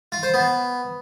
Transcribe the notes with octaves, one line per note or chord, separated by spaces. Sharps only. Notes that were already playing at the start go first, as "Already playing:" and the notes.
F4
C5
B3